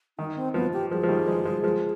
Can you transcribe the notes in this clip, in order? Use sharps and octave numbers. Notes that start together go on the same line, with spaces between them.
D#3 D#4
C4
F3 B3
G4
F3 G#4
F3
D#3 G3
F3 G#3
F3 G#3
F3 G#3